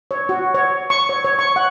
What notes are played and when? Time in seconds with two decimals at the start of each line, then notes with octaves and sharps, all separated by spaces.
0.11 C#5
0.29 F#4
0.55 C#5
0.90 C#6
1.09 C#5
1.25 C#5
1.39 C#6
1.56 F#5